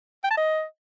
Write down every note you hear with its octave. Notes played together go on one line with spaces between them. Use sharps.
G5
A5
D#5